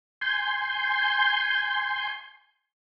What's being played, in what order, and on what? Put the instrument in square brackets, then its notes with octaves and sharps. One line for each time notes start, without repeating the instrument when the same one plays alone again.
[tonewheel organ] G#5 C6 G6